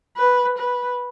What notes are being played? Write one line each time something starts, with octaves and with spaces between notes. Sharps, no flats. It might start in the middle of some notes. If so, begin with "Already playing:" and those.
B4
B4